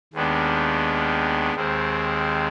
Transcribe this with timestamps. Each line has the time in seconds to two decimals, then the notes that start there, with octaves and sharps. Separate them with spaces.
0.13 D#2 D#3 G#3 B3 D4
1.54 D#2 D#3 G#3 C4